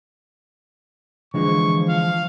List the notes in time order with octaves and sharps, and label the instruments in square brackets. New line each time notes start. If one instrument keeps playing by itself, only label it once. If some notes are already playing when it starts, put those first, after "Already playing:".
[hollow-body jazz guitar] D3 E3 G#3 [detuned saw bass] F3 [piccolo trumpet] C#6
[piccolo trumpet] F5